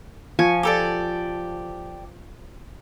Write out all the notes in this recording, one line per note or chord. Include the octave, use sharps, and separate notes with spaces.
F3 G#5 C#6
G4 A4 D5